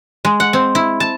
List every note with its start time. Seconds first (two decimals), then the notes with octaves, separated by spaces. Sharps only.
0.25 G#3
0.40 F#5
0.53 C4
0.75 E4
1.00 A5